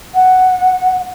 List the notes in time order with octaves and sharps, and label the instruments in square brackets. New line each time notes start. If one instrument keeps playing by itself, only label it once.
[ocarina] F#5